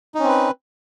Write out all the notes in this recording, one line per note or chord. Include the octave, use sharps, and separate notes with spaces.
C4 C#4 D#4 B4